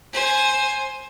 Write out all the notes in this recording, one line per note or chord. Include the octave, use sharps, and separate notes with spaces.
C5 G#5